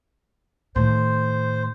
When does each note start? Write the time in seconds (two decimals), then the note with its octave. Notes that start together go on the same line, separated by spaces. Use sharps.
0.76 A2 D#3 C5